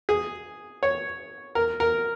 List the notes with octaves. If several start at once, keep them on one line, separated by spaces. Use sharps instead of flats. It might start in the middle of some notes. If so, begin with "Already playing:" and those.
G#4
C#5
A#4
A#4